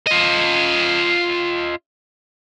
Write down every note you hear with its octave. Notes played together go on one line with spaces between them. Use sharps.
F4 D#5